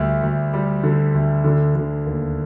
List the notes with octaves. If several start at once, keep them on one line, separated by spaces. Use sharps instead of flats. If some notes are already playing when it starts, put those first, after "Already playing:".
Already playing: D2 G3
D2
G3
D3
D2
D3
D3
D#2